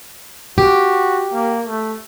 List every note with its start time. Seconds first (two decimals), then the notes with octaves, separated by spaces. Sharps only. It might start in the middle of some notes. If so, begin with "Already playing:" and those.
0.58 F#4 G4
1.33 A#3
1.66 A3